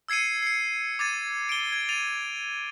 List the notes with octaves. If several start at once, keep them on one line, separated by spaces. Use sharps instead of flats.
E6 G#6 C7 C#7 D#7
C7 C#7
D6 G#6 A6 D#7
D7 G7
G#6
A6 D#7 F7